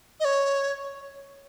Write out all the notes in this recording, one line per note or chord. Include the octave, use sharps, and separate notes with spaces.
D#5
C#5